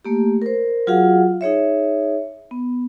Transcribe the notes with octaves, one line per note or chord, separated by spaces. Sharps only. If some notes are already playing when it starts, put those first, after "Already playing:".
A3 A#3 G4
A#4 C5
F#3 F4 F#4 G#4 F5 F#5
D#4 G#4 C#5 E5
B3